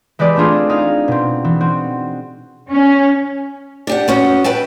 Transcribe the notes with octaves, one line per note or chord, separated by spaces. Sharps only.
E3 G#3 G4 B4 D5
A3 C4 D4 F4 G#4
D#4 G#4 F5
B2 C4
E3
C4 F#4
C#4
D4 G4 F#5
B3 C#4 F#4
B4 E5 G5 A5